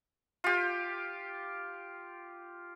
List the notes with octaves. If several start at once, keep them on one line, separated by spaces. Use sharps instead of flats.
F4 G4